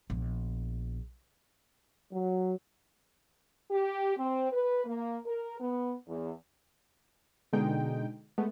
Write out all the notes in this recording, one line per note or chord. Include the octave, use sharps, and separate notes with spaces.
A#1 B3
F#3
G4
C4
B4
A#3
A#4
B3
E2
B2 D3 G#3 D#4 G5
G#3 A3 B3